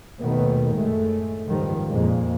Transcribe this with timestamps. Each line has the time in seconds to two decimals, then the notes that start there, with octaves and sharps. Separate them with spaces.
0.20 D#2 B2 D#3 A3 B3
0.73 F#2 A2 G#3 A3
1.47 C#2 G#2 D#3 F3 G3
1.88 F2 A#2 G#3 A#3